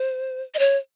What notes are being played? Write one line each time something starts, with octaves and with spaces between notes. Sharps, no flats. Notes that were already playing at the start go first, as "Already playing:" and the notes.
Already playing: C5
D#5
C#5